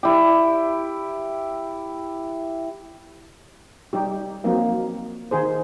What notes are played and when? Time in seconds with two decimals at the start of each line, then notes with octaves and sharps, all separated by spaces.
0.03 E4 G4
3.93 G3 D#4 G4
4.44 F3 F#3 A#3 C4 D#4
5.31 D#3 D#4 G#4 C5